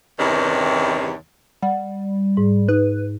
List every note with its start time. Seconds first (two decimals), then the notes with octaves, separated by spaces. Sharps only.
0.19 E2 G2 C3 D#3 E3 C#4
1.63 G3 F#5
2.37 G#2
2.69 D#4 B4